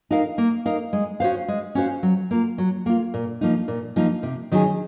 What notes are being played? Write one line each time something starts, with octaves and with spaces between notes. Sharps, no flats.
D#4 A#4 F5
A#3
D#4 A#4 F5
G#3
C#4 F#4 C5 F5
G#3
C#4 F#4 C5 F5
F#3
A#3 F4
F#3
A#3 F4
A#2
F3 A#3 D#4
A#2
F3 A#3 D#4
C3
D#3 F#3 C#4 G#4